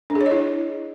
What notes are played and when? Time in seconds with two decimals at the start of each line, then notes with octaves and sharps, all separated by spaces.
0.10 D4
0.15 G#4
0.21 C#5
0.26 D#5
0.31 E4